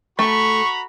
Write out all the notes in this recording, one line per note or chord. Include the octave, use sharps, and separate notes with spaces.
A3 F#4 A#5 B5 C#6